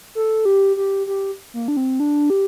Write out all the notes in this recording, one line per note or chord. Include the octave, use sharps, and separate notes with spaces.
A4
G4
G4
G4
A#3
D4
C4
D4
G4